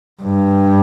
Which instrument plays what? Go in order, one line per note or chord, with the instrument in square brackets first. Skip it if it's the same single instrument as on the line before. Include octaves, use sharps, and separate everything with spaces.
[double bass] G2